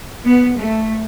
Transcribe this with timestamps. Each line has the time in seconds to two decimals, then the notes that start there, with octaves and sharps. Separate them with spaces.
0.25 B3
0.58 A3